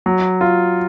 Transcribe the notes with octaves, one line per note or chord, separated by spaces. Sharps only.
F#3
F4